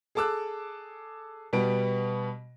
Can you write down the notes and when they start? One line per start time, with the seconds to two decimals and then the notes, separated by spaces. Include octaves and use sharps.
0.15 G#4 A4 A5 D6 E6 F#6
1.53 B2 G3 B3 D7